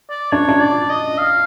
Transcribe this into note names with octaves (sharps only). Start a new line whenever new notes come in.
D5
D4 C#5
D4
D5
D#5
F5